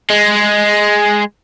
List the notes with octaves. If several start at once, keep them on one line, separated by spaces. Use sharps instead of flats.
G#3